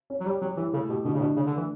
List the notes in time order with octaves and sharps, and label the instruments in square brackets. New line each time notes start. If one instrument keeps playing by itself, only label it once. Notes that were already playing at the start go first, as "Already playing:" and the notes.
[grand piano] C#4
[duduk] F#3
[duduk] G3 [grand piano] G4
[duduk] F#3 [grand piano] G3
[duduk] E3 [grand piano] E4
[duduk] C#3 [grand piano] A3
[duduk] B2 [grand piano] G4
[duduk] B2 [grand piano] D3
[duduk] C#3
[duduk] B2 [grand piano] D4
[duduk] C#3 [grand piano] D4
[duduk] D3
[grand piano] A3
[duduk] E3